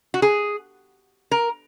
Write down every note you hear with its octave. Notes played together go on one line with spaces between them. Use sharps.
F#4
G#4
A#4